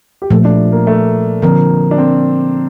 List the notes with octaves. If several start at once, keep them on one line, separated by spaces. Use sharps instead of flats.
G4
A#2 F3 A3 A4
D4
A#3
A3
D3 F3 A#3 C4
D4
C4